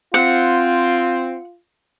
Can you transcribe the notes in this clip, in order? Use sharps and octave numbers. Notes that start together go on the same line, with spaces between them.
C4 F4 F#5